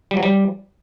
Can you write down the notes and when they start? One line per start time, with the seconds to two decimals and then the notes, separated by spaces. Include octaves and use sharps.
0.11 G3
0.17 F#3
0.23 G3